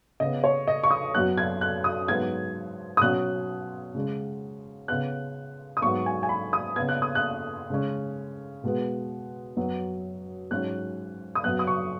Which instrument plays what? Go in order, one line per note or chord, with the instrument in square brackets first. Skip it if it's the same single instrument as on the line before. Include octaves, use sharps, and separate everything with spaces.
[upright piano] C#3 B3 D#5
C#5
D#5
C#6
D#6
F#2 F#3 B3 F#6
G#6
F#6
D#6
G#2 F#3 B3 G#6
D#6
B2 F#3 C#4 F#6
C#3 G#3 C#4
C#3 B3 F#6
D#6
G#2 F#3 B3 C#6
G#5
G#5
B5
D#6
C#3 B3 G#6
F#6
D#6
F#6
C#3 G#3 C#4
B2 G#3 B3
F#2 F#3 B3
G#2 F#3 C#4 F#6
D#6
F#2 F#3 B3 F#6
D#6
C#6